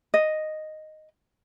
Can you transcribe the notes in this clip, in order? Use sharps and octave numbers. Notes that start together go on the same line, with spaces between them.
D#5